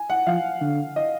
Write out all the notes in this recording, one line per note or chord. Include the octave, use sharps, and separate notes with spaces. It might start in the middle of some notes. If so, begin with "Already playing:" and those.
Already playing: G#5
F#5
F3 F5
D3
D#5